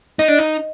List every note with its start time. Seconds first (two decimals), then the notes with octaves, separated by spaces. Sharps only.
0.19 D#4 D#5
0.28 D4
0.39 D#4